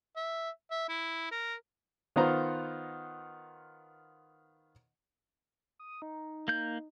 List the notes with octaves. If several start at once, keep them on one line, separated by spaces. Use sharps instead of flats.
E5
E5
E4
A#4
D#3 B3 F4 C5 F#5 A#5
D#6
D#4
A#3 G6